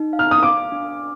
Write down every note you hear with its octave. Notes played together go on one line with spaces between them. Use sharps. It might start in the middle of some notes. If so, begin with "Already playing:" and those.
Already playing: D#4
F5
F6
D#6
F5 D6
D4